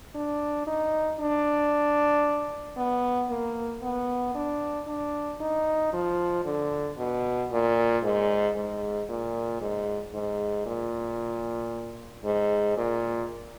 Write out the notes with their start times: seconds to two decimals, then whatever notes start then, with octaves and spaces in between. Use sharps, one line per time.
0.15 D4
0.67 D#4
1.20 D4
2.77 B3
3.29 A#3
3.82 B3
4.35 D4
4.87 D4
5.41 D#4
5.93 F3
6.45 D3
6.98 B2
7.51 A#2
8.03 G#2
8.56 G#2
9.09 A#2
9.61 G#2
10.14 G#2
10.66 A#2
12.25 G#2
12.77 A#2